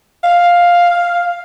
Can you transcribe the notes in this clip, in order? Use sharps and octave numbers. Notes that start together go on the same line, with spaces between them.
F5